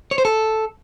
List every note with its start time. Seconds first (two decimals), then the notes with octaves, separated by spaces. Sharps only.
0.11 C#5
0.18 C5
0.25 A4